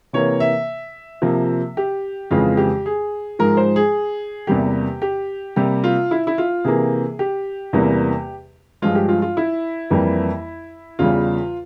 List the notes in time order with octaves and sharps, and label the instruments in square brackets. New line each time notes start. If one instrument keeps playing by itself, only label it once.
[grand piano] C3 E3 A#3 C#5
E5
C3 F3 A#3
G4
F2 C#3 E3 G#3 F4
G4
G#4
G#2 F3 G#3 A#4
C5
G#4
E2 C3 G3 A#3 G4
G4
C3 G3 A#3 G4
F4
E4
E4
F4
C3 E3 A#3 G#4
G4
E2 C3 E3 G3 A#3
G2 F3 G#3 F4
G4
F4
F4
E4
F2 E3 G3 A#3
E2 C#3 G3 F4